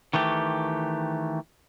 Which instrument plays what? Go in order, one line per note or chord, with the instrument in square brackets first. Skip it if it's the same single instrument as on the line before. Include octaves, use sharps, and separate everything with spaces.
[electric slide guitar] D#3 E3 A3 G4